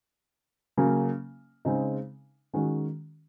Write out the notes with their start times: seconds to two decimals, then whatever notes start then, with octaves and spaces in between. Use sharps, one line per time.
0.77 C#3 F#3 A#3 C#4
1.65 C#3 G#3 C4 D#4
2.53 D#3 G#3 C#4 F#4